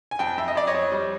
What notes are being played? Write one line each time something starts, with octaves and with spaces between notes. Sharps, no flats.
G#5
F2 G5 A5
F2 E5
D#5
F2 D5
C#5 D#5
F2
G3